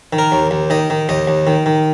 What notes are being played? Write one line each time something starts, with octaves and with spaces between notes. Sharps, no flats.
D#3
A#4
D#2
D#2
D#3 D#5
D#3
D#2 D#5
D#2
D#3
D#3